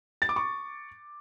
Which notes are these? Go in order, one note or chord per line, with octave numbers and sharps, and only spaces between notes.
A6
D6
C#6